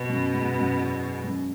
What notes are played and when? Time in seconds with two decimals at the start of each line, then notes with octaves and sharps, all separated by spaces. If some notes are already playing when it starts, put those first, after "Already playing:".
Already playing: B2
0.10 F#2
0.33 G#2
0.56 F#2
0.79 E2
1.24 F#2